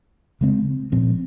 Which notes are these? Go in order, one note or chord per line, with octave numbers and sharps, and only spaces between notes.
C#3 G#3 C4
A#2 F3 C4